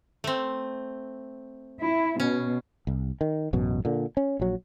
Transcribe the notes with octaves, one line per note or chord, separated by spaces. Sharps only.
A3 C4
E4
B2 C#4
C2
D#3
A1 F#2 B2
A#2 D3
C#4
A#1 F#3